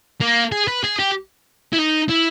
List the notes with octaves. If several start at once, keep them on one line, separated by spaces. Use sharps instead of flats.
A#3
G#4
B4
G#4
G4
E4
D#4
E4